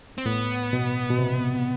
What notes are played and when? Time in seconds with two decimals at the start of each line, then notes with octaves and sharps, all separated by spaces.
0.18 C4
0.26 A2 B3
0.73 B2
1.10 B2
1.19 C3